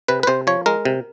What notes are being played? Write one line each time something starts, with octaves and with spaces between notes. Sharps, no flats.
C3 B4
B4
C3 C5
F3 C#5
G#3 A#4
C3